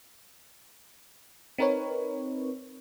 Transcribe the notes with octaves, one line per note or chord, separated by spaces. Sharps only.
C4 D#4 A#4 B4 C#5